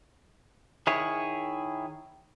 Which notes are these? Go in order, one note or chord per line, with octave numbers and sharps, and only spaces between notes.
D#3 E4 G#4 C#5